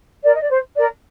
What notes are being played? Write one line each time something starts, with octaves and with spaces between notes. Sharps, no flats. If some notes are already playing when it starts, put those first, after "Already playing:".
A#4 D5
D#5
D5
C5
A#4 D5